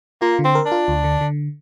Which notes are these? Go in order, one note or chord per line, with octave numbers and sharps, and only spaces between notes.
A#3 F4
D3
C4
A#4
D4
F4
D2
D3
D3